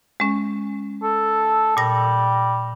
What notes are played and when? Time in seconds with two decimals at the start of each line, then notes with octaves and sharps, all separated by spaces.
0.20 G#3 C#4
1.03 A4
1.77 A#2 G3 A#6